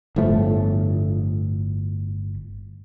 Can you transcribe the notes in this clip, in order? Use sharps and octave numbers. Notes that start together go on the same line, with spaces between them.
G1 A2 F3 A3